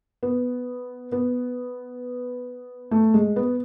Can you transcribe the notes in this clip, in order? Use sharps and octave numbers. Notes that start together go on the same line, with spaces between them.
B3
B3
A3
G#3
B3